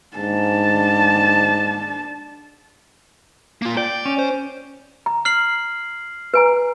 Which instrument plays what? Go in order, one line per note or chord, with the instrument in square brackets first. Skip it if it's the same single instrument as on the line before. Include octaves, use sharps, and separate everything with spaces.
[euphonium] G#2 [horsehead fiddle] D4 A5
[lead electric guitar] A#3 F4
[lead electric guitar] D5 [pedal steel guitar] G5
[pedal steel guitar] C#4
[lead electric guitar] C5
[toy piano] A#5
[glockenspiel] F6 C7 F#7
[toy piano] B4 G#5 A#5